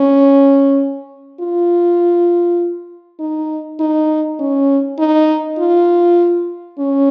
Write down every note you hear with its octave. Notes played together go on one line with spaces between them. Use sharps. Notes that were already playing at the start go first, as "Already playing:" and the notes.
Already playing: C#4
F4
D#4
D#4
C#4
D#4
F4
C#4